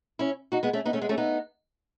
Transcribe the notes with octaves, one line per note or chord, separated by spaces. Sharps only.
C#4 E4
D#4 F#4
G#3 B3
A3 C#4
B3 D#4
A3 C#4
G#3 B3
A3 C#4
B3 D#4